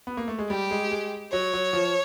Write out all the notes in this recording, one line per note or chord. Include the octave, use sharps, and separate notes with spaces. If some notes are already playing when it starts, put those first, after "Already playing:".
B3
A#3
A3
G#3
G3 G4
G#3
G#3
F#3 C#5
F#3
F3